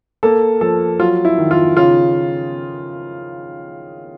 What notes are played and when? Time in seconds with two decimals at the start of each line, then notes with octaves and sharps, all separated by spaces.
0.23 A#3 A4
0.61 F3 A4
0.99 F#3 F4
1.25 E4
1.38 D#3
1.51 F4
1.77 C#3 F4